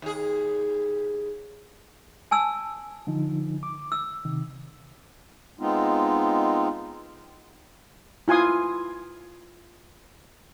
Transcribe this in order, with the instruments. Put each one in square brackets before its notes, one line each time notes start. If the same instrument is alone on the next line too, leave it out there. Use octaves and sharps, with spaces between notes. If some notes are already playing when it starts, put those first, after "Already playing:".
[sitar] D#2 G#4
[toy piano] G#5 A5 E6
[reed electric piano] D3 F3 D#4
D6
[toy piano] E6
[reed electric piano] C3 D#3
[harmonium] G#3 B3 C4 D#4 F4
[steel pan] E4 F4 G#5 C6 D#6